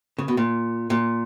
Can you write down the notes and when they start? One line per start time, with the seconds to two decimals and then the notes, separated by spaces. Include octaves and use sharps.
0.18 C#3
0.28 B2
0.37 A#2
0.90 A#2